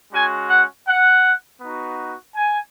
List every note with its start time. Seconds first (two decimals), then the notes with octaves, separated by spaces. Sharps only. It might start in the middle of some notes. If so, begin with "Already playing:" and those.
0.13 G#3 C#4 F#4 G#5
0.50 F#5
0.87 F#5
1.61 B3 D#4 F#4
2.35 G#5